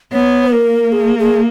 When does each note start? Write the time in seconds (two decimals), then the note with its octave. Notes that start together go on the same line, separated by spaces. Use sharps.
0.12 B3 C#5
0.52 A#3 A#4
0.92 G#4
1.19 G#4